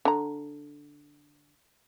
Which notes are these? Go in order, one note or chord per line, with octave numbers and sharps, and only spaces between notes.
D3 A#5